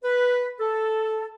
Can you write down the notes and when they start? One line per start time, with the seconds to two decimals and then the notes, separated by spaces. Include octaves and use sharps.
0.03 B4
0.60 A4